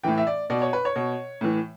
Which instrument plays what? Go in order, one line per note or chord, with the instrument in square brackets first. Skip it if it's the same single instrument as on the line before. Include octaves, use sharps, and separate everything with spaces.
[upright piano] A2 E3 G5
E5
D5
B2 D5
C#5
B4
C#5
B2
A2 E3